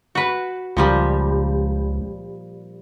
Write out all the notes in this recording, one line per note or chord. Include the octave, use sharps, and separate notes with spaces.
F#4 B4
C#2 A#2 F3 G3